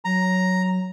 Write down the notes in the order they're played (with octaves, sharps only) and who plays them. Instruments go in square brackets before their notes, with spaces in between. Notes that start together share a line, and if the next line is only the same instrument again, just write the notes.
[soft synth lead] F#3 [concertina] A#5